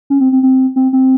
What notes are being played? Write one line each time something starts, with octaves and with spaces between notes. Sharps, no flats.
C#4
C4
C4
C4
C4
C4